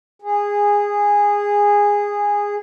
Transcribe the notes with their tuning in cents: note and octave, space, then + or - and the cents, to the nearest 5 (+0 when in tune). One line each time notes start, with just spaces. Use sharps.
G#4 -15